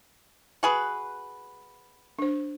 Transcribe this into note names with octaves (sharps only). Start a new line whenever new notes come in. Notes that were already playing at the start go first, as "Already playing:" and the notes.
F#4 G#4 B4
D4 C5